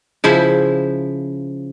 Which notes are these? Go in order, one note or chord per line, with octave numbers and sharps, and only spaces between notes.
C#3 F3 E4 C5